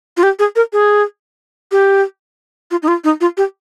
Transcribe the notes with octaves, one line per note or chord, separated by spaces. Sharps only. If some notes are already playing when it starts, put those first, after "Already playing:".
F4
G4
G#4
A#4
G#4
G4
F4
D#4
F4
D#4
F4
G4